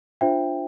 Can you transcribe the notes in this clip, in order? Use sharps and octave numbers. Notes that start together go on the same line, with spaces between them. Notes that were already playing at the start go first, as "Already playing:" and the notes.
D4 F4 C5 E5 G5